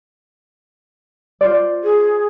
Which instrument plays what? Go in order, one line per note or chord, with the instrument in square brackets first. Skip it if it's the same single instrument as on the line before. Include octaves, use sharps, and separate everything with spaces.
[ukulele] F4 C5 D5
[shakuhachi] G#4